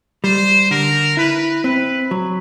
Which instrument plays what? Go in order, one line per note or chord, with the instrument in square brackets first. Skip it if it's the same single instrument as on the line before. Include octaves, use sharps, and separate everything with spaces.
[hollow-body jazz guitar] G3 [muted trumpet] C5
[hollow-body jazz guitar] D3 [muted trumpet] A#4
[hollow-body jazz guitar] E4 [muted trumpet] B4
[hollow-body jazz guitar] C4 [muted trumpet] B4
[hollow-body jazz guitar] F#3